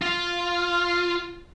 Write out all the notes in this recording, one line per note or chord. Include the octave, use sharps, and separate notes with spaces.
F4